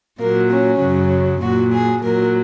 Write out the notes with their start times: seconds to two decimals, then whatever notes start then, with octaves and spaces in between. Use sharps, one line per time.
0.19 A#2 F#3 A#3
0.50 C#4
0.81 F#2 C#3 F#3
1.41 A#2 F#3 F#4
1.73 G#4
2.03 A#2 F#3 A#4